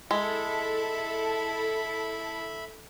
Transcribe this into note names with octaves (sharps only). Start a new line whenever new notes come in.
G#3 E4 A4 E5 B5